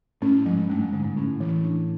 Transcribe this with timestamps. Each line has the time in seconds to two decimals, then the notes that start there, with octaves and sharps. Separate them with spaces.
0.22 A2 C#4
0.46 G#2 F3
0.69 G2 A3
0.81 G#2
0.93 G#2 D3
1.04 G#2
1.16 A2 C#4
1.40 E3
1.63 D4